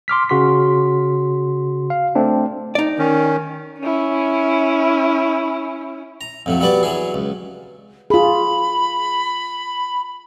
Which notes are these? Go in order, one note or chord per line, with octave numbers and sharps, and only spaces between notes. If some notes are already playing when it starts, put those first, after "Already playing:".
C6 D6 F6 B6
C#3 F#4 C6 B6
F5
A3 C4 D4
D#4 D5
D#3 C#4
C#4 E4
A#5
F2 A2 F#3
F#3 G3 B3 B4 D5
E3 F#3 G#4
C#2
F4 G#4 B5